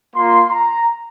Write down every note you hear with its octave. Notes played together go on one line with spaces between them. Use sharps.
A#3 F4 C6
A#5